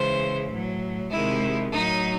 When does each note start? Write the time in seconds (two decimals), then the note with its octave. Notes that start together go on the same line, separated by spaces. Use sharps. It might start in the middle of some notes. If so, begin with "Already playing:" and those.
Already playing: C#3 E3 G#3 C5
0.51 A2 F#3
1.11 C3 D#3 G#3 E4
1.72 A2 F#3 D#4